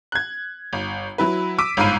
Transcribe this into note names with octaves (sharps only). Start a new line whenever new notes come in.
F#6 G#6
G1
F#3 E4 B4
D6 E6 B6 D7 D#7
G1 G#2 F5 B5 D#7